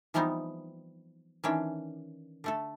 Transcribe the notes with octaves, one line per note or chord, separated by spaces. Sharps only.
E3 F3 G3 B3 C4 D#4
D#3 E3 C#4 D4
D3 A3 A4